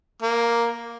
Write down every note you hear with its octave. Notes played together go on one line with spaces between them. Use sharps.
A#3